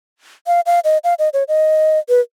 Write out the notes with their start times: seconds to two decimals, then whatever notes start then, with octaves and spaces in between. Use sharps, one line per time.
0.47 F5
0.66 F5
0.84 D#5
1.04 F5
1.19 D#5
1.33 C#5
1.48 D#5
2.09 B4